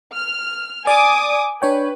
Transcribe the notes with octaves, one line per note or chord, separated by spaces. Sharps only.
F6
D5 G#5 D6 D#6
D4 B4 C#5 G5